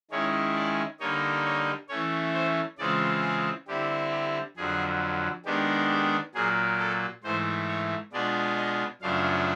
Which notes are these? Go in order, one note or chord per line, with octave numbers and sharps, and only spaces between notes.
D#3 G#3 C#4 E4 C#5
D5
D3 G3 A#3 D#4 C#5
C#5
E3 A3 C#4 C#5
C5
C#3 E3 G#3 C4 F4 D5
G#4
D3 G3 C4 E4 G4
G4
F2 D3 F#3 G#4
D#3 G#3 B3 D4 G4
G4
A#2 F#3 A#3 G#4
A4
G#2 E3 A3 C5
C#5
B2 G#3 B3 D4 F4 D5
D#5
F#2 C#3 F3 A3 D4 F5